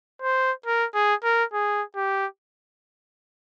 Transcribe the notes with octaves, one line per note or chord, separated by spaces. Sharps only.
C5
A#4
G#4
A#4
G#4
G4